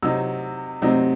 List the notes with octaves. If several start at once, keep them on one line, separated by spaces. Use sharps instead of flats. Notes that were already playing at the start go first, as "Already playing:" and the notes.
C3 F#3 C4 D#4 E6
C3 F#3 C4 D#4